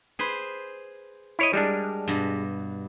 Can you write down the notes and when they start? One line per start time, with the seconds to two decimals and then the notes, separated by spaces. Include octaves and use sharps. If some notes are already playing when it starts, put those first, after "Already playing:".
0.19 G#4 B4 C5
1.39 E4 C#5 D#5
1.53 G3 G#3 D4 A#4
2.08 G2 B2